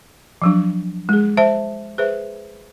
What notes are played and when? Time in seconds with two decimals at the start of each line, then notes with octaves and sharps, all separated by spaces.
0.42 F3 F#3 D4
1.09 G#3 G#4
1.37 C5 E5 A5
1.98 G#4 B4 C5 E5